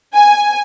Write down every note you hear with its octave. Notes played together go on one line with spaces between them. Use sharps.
G#5